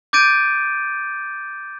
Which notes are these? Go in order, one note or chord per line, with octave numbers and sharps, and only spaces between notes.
D6 G6 A6 D7 D#7